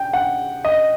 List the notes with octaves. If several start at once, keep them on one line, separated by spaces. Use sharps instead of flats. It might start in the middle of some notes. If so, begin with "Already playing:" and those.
Already playing: G5
F#5
D#5